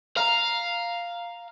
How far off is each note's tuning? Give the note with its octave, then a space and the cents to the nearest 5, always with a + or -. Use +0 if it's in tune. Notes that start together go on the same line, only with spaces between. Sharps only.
F5 +0 A#5 +0